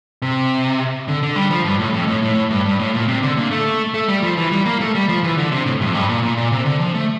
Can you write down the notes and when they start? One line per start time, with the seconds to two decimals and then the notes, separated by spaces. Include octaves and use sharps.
0.22 C3
1.08 D3
1.23 D3
1.36 G3
1.50 F3
1.65 G2
1.80 A2
1.93 F2
2.08 A2
2.22 A2
2.50 G2
2.66 G2
2.79 A2
2.94 A#2
3.08 C3
3.22 D3
3.37 A#2
3.51 A3
3.94 A3
4.08 G3
4.23 F3
4.37 E3
4.51 G3
4.66 A#3
4.80 A3
4.95 G3
5.09 F3
5.24 E3
5.38 D3
5.52 C3
5.66 A2
5.81 G2
5.85 F2
5.95 G2
6.09 A#2
6.23 A#2
6.37 A#2
6.52 C3
6.66 D3
6.80 F3
6.94 A3